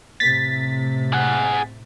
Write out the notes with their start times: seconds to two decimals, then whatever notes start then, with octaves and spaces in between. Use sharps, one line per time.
0.20 A2 C3 A6 B6
1.13 G#4 F#5